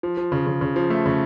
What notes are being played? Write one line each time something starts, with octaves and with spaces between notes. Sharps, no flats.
F3
F3
C#3
C#3
C#3
F3
A3
C#3